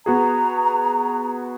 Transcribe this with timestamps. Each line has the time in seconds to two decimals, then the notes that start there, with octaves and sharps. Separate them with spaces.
0.06 B3 F#4 G#4 A#5